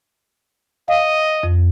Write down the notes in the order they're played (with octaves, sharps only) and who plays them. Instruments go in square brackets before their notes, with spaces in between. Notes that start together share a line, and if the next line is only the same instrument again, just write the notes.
[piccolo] D#5 [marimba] F5
[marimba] F2